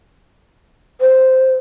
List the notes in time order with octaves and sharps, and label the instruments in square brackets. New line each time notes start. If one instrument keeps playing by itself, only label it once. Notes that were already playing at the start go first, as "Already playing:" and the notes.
[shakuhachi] C5